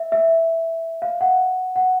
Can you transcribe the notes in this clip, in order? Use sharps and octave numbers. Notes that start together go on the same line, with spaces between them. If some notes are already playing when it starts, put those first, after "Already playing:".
Already playing: E5
E5
F5
F#5
F#5